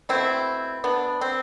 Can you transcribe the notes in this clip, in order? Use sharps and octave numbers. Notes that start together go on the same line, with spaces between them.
B2 A3 C4 E4
B3 D4
C4